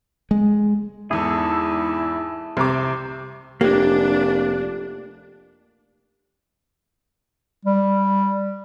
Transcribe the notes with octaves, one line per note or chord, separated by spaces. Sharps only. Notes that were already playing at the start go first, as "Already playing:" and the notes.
G#3
E2 G#2 E4 G#4 A4
C2 C3 A#5 D6
F1 A#3 D4 G4
G3